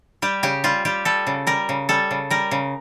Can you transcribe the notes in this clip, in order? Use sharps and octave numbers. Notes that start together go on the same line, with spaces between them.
G3 G4
C#3 G4
G3 F4
G3 G4
G3 A4
C#3
G3 A#4
C#3
G3 A4
C#3
G3 A#4
C#3